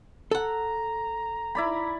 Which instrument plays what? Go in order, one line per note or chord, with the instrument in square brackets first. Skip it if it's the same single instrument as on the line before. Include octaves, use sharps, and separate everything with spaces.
[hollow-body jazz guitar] A4 F#5 [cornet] A#5
[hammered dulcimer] E4 D5 B5